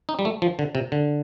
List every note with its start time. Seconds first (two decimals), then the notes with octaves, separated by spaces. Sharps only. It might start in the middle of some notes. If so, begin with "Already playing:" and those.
0.09 D#4
0.19 G3
0.25 A3
0.42 F3
0.59 D3
0.75 C3
0.92 D3